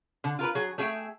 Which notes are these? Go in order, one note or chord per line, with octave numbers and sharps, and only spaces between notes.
D3
F4 A#4 B4
F#3 G#4
A3 G#4 E5 G5